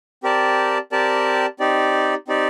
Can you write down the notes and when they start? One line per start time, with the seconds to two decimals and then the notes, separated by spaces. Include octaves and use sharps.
0.23 C4 G4 A#4 D5 A5
0.92 C4 G4 A#4 D5 A5
1.59 C4 D#4 G4 D5
2.28 C4 D#4 G4 D5